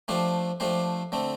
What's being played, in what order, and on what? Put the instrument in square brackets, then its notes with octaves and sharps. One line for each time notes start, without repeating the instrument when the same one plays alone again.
[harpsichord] F3 A3 D4 G4 C5
F3 A3 D4 G4 C5
D3 A3 C4